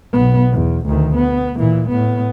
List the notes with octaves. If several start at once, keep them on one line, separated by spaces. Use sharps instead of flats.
B1 B3
E2
D2 D#3
B3
A#2 E3
A2 B3